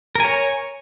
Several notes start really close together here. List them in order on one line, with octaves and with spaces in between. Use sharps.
A#4 G#5 C#5